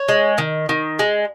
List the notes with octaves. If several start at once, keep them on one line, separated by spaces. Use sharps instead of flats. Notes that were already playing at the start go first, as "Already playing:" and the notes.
Already playing: C#5
G#3
D#3
D#3
G#3